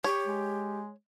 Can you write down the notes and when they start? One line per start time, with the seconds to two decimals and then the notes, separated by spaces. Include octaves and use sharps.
0.04 G4 C#5
0.27 G#3